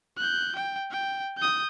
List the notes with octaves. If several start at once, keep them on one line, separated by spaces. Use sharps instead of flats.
F#6 G6
G5
G5
D#6 G6